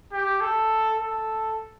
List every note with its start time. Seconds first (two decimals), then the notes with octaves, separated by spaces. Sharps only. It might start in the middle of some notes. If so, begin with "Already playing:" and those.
0.12 G4
0.41 A4
1.00 A4